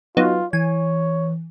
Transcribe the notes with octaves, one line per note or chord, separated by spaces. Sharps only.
F#3 B3 D#4 F4
E3 C#5 G#5